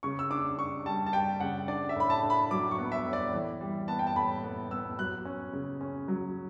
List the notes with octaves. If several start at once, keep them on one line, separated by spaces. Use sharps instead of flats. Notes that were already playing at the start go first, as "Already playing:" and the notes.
C#3 C#6
E6
D4 D6
D4 C#6
G3 A5
A5
G3 G5
C#3 F#5
D4 D5
E5
A2 B5
A5
D4
B5
F#3 D6
C#6
B3
E5
A2
D5
E3
G3
B3 A5
G5
A5
A2 B5
B3
B3 E6
F#3 F#6
C#4
C#3
C#4
F#3